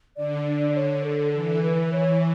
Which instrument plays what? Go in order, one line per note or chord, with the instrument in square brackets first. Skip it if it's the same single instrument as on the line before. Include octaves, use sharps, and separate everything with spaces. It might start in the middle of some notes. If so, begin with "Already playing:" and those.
[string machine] D3 [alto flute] D5
[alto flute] C#5
A4
[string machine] E3 [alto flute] A4
[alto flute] B4
C#5